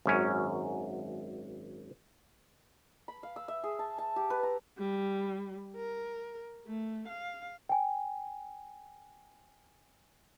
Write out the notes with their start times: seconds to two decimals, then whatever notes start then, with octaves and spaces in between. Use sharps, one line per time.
0.06 G#1 F#2 C#4
3.08 B5
3.23 F5
3.36 E6
3.48 E5
3.64 G#4
3.79 A5
3.98 A5
4.16 G4
4.30 B4
4.43 A#5
4.78 G3
5.76 A#4
6.67 A3
7.08 F5
7.69 G5 G#5